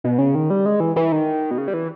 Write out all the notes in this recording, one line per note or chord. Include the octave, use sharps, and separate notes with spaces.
B2
C#3
D#3
G3
G#3
E3
E3
D#3
B2
C#3
G3
E3